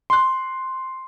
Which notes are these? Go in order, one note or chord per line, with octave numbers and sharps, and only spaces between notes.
C6 F#6